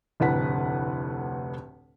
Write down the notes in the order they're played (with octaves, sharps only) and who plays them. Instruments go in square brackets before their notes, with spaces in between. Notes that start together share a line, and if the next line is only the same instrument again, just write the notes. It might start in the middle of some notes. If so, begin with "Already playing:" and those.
[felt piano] F1 D2 A2 B4 F#5 B6